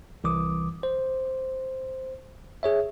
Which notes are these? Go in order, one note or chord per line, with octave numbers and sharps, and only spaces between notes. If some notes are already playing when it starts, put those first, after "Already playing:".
C2 E3 D6 D#6
C5
G#4 C#5 E5